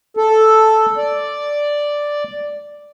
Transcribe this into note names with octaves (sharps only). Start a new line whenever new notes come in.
A4
D5